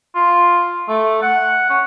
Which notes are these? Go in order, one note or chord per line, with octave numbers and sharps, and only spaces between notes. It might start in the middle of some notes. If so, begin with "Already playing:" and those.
F4
A3
F#5
C#4